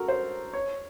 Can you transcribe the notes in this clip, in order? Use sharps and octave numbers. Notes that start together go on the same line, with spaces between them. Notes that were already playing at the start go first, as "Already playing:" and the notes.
Already playing: F#4 A4 A#4
C5
C#5